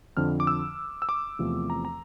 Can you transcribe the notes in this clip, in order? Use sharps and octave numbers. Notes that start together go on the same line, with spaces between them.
F2 D3 F3 F6
D6
E6
E6
D6
E2 C3 F3 A3 C4
A#5
A#5